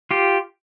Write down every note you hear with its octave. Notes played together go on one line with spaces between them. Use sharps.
F4 G4